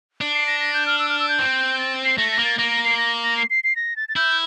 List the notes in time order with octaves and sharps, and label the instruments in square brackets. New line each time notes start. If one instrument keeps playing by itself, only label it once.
[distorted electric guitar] D4
[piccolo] C7
A#6
A#6
G6
F6
E6
F6
E6
G6
[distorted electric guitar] C4
[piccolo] A6
C7
[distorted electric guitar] A3 [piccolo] A#6
[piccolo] A#6
[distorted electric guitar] A#3
[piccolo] A6
[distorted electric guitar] A#3 [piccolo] A#6
[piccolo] A#6
C7
A#6
A#6
C7
C7
C7
A#6
A6
A6
[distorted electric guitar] E4 [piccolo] G6